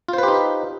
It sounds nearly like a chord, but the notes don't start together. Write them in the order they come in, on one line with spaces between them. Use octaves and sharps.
F4 C5 B4 G4 D#4